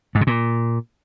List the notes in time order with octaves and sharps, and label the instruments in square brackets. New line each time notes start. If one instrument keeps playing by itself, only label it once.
[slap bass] G#2
C3
A#2